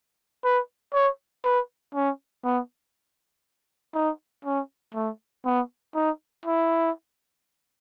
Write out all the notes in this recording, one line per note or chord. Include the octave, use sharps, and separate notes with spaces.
B4
C#5
B4
C#4
B3
D#4
C#4
A3
B3
D#4
E4